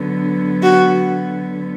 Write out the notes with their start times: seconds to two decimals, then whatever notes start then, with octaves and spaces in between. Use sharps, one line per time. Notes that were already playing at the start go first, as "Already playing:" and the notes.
Already playing: D3 F#3 B3
0.63 F#4